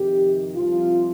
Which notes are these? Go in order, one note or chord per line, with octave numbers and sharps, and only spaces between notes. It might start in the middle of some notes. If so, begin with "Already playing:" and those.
Already playing: F2 C3 D#3 G4
C2 C3 F3 F4